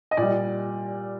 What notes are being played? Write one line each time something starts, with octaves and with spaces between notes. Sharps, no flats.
D#5
A#2 G3 D5